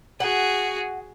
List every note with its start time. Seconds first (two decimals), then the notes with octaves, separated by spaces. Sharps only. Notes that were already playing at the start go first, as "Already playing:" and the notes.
0.20 F#4 G#4 F#5